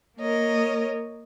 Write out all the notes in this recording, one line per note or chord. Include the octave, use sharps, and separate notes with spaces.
A#3 A#4 C#5 D#5